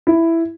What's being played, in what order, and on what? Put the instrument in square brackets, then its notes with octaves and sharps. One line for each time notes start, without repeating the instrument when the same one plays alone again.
[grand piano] E4